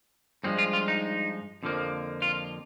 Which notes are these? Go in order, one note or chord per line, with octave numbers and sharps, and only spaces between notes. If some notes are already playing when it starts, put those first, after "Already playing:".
G2 F3 G#3 C4
F4
F4
D#4
F2 D3 F3 A#3
F4